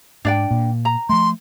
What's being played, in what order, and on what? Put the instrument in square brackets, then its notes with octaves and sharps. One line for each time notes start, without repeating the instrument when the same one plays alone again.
[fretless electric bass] G#2 [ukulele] D4 D5 G5
[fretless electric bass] A#2
[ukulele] A#5
[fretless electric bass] F3 A3 [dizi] C6